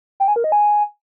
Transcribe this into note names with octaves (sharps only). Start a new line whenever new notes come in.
G5
G#5
A#4
D#5
G#5